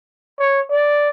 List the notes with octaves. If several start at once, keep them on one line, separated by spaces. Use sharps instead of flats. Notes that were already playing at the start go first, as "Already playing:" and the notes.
C#5
D5